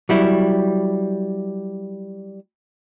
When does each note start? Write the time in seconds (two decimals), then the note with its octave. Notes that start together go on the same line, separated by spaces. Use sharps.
0.09 F#3 G3 E4